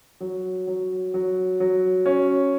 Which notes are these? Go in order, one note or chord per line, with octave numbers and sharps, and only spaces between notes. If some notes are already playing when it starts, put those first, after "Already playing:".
F#3
F#3
F#3
F#3
C#4